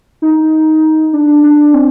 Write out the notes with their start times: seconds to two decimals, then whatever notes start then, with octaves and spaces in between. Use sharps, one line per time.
0.22 D#4
1.13 D4
1.43 D4
1.74 C4